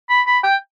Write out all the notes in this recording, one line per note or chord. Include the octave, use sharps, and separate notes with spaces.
B5
B5
G5